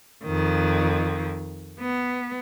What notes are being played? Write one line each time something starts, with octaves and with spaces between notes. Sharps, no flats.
F2 D#3
B3